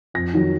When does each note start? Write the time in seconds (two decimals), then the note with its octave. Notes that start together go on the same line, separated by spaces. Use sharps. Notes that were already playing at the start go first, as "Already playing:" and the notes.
0.14 F2 A#6
0.34 D#3 F#3